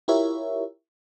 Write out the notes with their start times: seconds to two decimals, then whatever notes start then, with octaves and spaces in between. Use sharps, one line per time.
0.08 E4 F4 G4 A#4 C#5 E5